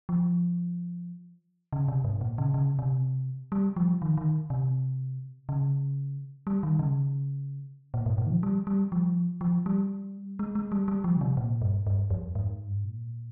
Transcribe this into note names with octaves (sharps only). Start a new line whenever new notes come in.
F3
C#3
C3
G#2
A#2
C#3
C#3
C3
G3
F3
D#3
D#3
C3
C#3
G3
D#3
C#3
A#2
G#2
A#2
D#3
F3
G3
G3
F3
F3
G3
G#3
G#3
G3
G3
F3
C#3
C3
A#2
G2
G2
F2
G#2
G2
G#2
A#2